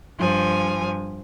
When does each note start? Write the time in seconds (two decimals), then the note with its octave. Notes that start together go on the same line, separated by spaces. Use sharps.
0.18 G2 F3 G#5